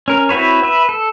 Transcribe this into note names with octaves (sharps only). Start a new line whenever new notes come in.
C#4 A#4
C4 E4 F#4 B4 C#5
B4 E5
A4